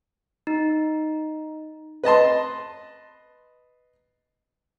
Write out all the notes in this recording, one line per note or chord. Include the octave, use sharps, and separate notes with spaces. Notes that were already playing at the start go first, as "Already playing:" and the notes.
D#4
B4 D#5 A5 C6